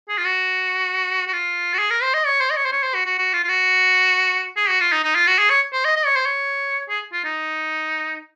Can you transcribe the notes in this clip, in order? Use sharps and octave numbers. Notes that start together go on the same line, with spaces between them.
G#4
F4
F#4
F#4
F4
F#4
G#4
A#4
C5
D#5
C#5
C5
D#5
C#5
C5
C#5
C5
F#4
F#4
F#4
F4
F4
F#4
G#4
F#4
F4
D#4
D#4
F4
F#4
G#4
C#5
C5
D#5
D#5
C#5
C5
C#5
G#4
F4
D#4